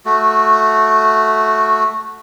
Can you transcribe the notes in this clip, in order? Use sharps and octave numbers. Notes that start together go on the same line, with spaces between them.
A3 F#4